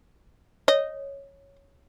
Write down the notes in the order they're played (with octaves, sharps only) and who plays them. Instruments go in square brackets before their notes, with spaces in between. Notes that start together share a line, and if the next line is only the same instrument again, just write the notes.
[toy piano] C#5 [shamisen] D#5